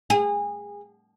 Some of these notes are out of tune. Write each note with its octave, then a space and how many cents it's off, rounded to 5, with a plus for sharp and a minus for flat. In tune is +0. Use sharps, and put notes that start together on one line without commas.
G#4 -25